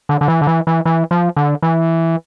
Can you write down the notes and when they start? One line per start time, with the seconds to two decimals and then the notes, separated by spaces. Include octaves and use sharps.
0.09 D3
0.21 D3
0.28 E3
0.41 D3
0.47 E3
0.67 E3
0.85 E3
1.11 F3
1.36 D3
1.62 E3